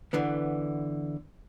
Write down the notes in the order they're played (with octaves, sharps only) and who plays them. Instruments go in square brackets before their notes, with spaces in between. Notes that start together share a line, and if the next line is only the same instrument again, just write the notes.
[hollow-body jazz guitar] D3 E3 B3